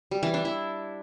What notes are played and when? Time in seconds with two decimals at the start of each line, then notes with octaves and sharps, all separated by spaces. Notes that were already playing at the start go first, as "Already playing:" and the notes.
0.11 G3
0.23 E3
0.34 D4
0.45 E4